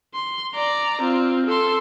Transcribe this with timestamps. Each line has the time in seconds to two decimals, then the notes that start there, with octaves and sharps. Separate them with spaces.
0.14 C6
0.55 D5 A#5
1.01 C4 F4
1.46 A4 C6